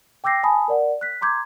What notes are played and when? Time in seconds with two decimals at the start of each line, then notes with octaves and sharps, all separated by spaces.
0.24 G5 D6 E6 G6 A#6 C7
0.43 G#5 A5 B5 D#6
0.68 A#4 D5 F#5
1.01 F#6 B6
1.21 A#5 C6 D6 G6 G#6